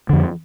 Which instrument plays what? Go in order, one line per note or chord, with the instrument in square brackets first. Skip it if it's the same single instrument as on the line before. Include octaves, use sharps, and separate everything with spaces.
[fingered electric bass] F2 D3